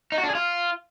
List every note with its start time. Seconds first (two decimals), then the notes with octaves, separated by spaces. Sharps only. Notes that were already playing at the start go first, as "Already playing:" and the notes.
0.12 D#4
0.18 F#4
0.23 D4
0.29 G#4
0.35 F4